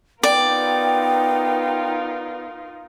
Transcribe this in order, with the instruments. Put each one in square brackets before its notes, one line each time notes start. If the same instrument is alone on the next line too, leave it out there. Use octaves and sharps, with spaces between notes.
[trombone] B3 [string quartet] D#4 F4 A#4 [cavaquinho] D5 [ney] G5